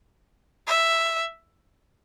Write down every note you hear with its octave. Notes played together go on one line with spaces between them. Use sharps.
E5